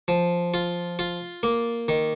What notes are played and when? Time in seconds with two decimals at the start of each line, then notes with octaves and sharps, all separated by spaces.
0.08 F3
0.54 F4
0.99 F4
1.43 A#3
1.88 D#3